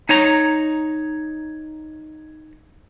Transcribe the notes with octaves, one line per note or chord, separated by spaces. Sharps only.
D#4 C#5 A#5